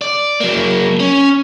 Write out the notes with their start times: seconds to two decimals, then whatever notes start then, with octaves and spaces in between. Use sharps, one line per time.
0.01 D5
0.41 F#3 A#3
1.00 C#4